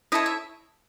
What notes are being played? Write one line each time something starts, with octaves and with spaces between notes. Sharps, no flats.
E4 A4 C#5 D#5
E5